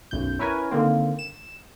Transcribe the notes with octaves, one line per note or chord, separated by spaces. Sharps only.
B1 F#2 G6
C#4 E4 A#4 B4 C#5 G#5
D3 D#3 A#3 C4
E7